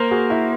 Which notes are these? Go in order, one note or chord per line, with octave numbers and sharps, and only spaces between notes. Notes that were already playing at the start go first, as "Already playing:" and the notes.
Already playing: A#3 A#4 C5
F#4 G#4
E4 F#4